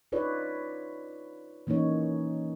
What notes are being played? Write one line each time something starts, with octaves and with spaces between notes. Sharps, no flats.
D#4 F4 B4 C#5 D5
E3 A#3 C#4 D#4 C#5